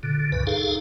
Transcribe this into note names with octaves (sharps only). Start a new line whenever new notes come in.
A#2 D3
C#2 G2 B4
D#4 G#4 A4 F5